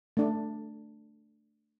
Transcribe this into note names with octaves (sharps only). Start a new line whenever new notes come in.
A3 D4